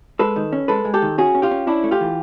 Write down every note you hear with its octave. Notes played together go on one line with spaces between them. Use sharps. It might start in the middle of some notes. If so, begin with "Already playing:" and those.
G#3 A4 B4
D#3
C#4
G#3 A4 B4
G#3
G4 A4
D#3
C#4 F#4 G#4
C#4
F4 G4
C#4
C#4 D4 E4
A3
F4 G4
E3